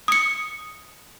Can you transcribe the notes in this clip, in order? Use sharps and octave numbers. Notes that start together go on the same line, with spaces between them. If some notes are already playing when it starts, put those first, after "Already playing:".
D#6 C#7